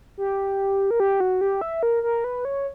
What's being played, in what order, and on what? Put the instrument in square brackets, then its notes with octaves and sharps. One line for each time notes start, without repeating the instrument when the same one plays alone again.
[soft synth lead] G4
A#4
G4
F#4
G4
E5
A#4
A#4
B4
C#5